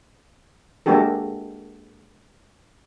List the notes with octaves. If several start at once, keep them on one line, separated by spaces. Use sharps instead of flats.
G#3 A#3 D4 F#4 G4 A4